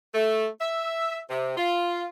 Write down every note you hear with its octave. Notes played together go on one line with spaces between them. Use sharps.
A3
E5
C3
F4